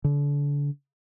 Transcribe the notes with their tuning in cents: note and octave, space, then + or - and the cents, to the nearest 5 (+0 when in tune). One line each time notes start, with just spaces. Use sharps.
D3 -35